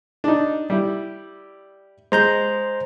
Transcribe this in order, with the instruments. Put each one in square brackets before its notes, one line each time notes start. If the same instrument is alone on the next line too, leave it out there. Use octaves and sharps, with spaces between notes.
[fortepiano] D4 D#4
G3 E4
[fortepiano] G#3 [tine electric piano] C5 A#5 G6